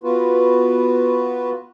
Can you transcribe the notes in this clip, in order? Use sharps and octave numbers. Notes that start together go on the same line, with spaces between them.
B3 F4 F#4 B4